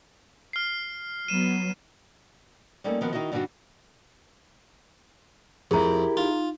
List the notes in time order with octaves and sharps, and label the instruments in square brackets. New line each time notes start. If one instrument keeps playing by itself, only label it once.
[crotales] F6 C7
[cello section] F#3 B3 [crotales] D#7 E7
[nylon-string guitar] G3 A3 A#3 C#4 D#4 A4
D#3 F3 B3 F#4 A#4
D#3 D#4 E4 F#4 D#5
G2 D3 G3 D4 D#4 F#4
[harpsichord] F2 [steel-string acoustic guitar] E4 G4 [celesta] G#4 A#5 [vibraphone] A#4
[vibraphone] D#4 [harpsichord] F4